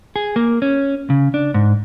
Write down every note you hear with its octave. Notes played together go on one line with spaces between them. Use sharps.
G#4
A#3
C#4
C#3
D4
G#2